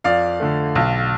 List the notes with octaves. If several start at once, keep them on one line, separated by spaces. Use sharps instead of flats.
F2 D5 F5
D3 A3
B1